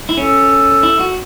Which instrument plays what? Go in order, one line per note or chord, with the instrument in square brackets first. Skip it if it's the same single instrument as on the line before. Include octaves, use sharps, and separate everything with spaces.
[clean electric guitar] E4
[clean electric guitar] C#4 [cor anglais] A4
[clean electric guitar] E4
F#4